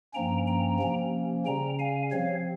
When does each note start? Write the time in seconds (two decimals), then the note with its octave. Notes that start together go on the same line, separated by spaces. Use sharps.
0.14 G2 F3 A#3 C#4 G5 A#5
0.47 G5 A#5
0.80 C3 F3 A#3 C#4
1.46 C#3 G3 C#4 G5 A#5
1.79 F5 G#5
2.12 C3 F3 C4 C#5 F5